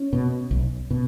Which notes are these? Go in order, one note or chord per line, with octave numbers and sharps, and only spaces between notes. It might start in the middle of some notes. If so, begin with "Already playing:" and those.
Already playing: C#4
B2
B1
B2